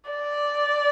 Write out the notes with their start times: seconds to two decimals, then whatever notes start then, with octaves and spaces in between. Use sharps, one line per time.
0.10 D5